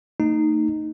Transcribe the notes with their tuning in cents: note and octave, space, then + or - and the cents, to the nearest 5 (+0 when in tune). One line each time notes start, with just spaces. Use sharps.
A3 +45 D#4 -10